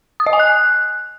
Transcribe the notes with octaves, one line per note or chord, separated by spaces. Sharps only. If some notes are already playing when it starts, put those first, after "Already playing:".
D#6
D#5
G#5
F#6